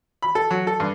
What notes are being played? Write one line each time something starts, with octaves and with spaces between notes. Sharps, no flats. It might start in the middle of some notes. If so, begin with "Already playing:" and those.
B5
A4
F#3
A4
G2